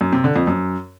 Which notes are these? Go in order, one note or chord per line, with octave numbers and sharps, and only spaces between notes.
F#2
C3
D3
F2
F#2